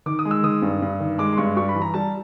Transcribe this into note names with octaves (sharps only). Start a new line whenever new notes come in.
D#3 D6
D#6
G#3
E6
D#3 D#6
G2
G2
D#3
G#3 D6
C6
G2 C#6
G3 C#6
B5
E3
A#5
G3 A5